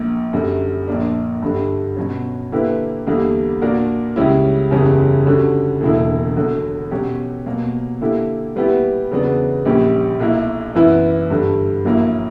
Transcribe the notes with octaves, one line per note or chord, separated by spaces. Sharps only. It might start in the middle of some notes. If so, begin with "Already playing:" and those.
Already playing: A#1 A#2 A#3
F#2 D3 G3
A#1 A#2 A#3 D4
G2 D3 G3
B2 F#3 C#4
D3 A#3 E4 G4 B4
E2 D3 G3 A#3
A#2 A#3 D4 F#4 A#4
C#2 C#3 G3 C#4 E4
F#1 E2 C#3 G3 C#4
D3 G3 C#4 F#4
E1 E2 D3 A#3 E4
E2 D3 F#3
B2 F#3 C#4 G4 C#5
B2 F#3 A#3
D3 A#3 E4 G4
A#2 G3 B3 E4 G4
E2 C#3 F#3 B3 D4
A#1 A#2 G3 C#4 G4
B1 A#2 A#3 E4
F#2 E3 B3 E4 B4
G2 D3 G3
A#1 A#2 F#3 A#3 E4